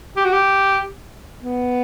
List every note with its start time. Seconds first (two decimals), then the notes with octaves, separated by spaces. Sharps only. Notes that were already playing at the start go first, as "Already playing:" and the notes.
0.16 G4
0.25 F#4
0.33 G4
1.40 B3